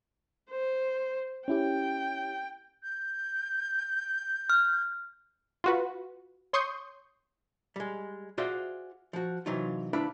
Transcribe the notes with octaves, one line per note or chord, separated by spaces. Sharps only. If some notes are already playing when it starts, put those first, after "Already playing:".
C5
C#4 E4 G4 G5
G6
F6
F4 F#4 B4
C#5 C6 C#6 D#6 G6
G3 G#3
F4 F#4 G#4 C5 D5 E5
F3 F#4
C3 E3 F#3 D#4 F4
D2 D4 E4 B4 F5 B5